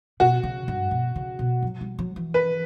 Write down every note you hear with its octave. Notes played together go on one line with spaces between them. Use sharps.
B2 F#4
C#3
G2
B2
C#3
B2
F#3
G3
F#3
E3
B4